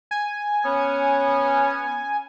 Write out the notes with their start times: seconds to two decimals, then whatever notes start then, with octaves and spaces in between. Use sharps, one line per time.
0.11 G#5
0.65 B3 C#4